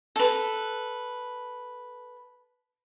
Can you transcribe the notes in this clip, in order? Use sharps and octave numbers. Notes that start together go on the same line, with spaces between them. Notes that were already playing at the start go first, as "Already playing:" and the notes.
A4 B4